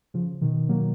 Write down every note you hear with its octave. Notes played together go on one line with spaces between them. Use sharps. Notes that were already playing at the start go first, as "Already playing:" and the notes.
C#3 F3
B2 D#3
F#3 A#3